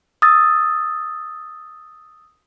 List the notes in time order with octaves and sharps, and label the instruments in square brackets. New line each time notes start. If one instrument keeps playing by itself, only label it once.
[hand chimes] D#6 E6 A6